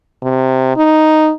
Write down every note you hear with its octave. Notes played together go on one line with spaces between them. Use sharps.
C3
D#4